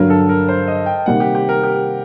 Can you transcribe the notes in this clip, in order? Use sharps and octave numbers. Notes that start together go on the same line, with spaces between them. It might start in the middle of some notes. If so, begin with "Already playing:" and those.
Already playing: G2 D3 F#3 A#4
A4
A#4
C5
D#5
G5
C3 D#3 G3 A#3 F#5
G4
G4
A#4
G4